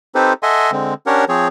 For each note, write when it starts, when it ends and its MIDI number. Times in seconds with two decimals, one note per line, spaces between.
0.15 0.33 60
0.15 0.33 63
0.15 0.33 67
0.15 0.33 69
0.15 0.33 71
0.15 0.33 72
0.43 0.71 69
0.43 0.71 75
0.43 0.71 76
0.43 0.71 78
0.43 0.71 80
0.43 0.71 84
0.72 0.94 50
0.72 0.94 56
0.72 0.94 60
1.06 1.25 61
1.06 1.25 62
1.06 1.25 67
1.06 1.25 70
1.06 1.25 73
1.06 1.25 78
1.29 1.48 53
1.29 1.48 60
1.29 1.48 68
1.29 1.48 73